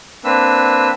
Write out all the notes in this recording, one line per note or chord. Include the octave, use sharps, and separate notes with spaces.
A#3 C4 D4 B4 E6